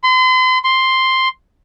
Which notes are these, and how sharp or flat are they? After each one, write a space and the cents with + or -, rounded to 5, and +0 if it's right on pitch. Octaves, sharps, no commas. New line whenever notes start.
C6 -40
C6 +0